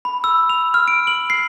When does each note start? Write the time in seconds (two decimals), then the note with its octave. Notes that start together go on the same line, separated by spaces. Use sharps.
0.05 B5
0.24 E6
0.49 F7
0.74 F6
0.88 D7
1.07 F#7
1.30 C7